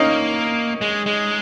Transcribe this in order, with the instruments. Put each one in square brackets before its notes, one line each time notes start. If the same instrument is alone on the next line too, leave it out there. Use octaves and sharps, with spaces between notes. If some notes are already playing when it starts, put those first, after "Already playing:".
Already playing: [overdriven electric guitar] A#3 [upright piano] C#4 D#4
[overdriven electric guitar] G#3
G#3